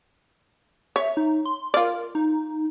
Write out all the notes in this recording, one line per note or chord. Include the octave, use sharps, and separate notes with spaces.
C#5 E5
D#4
C6
F4 A#4 D5
D#4